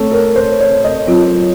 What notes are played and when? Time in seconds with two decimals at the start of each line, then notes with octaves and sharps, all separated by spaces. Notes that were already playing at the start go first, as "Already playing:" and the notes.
Already playing: A3 C4 A4 C#5
0.12 A#4
0.36 C5
0.60 C#5
0.84 D#5
1.07 F#3 C4 F4